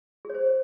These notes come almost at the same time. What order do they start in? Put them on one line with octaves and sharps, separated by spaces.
G#4 C#5 C5